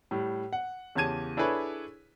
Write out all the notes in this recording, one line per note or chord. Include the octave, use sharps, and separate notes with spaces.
A2 G3
F#5
E2 C#3 G4 A5 G#6 D#7
D4 E4 G#4 A4 B4 C#5